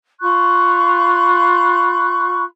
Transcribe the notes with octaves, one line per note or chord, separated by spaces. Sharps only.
F4 B5 C#6 F#6